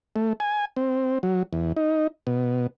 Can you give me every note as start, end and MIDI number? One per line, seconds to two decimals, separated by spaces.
0.16 0.33 57
0.40 0.65 80
0.76 1.18 60
1.23 1.43 54
1.53 1.73 40
1.77 2.07 63
2.27 2.67 47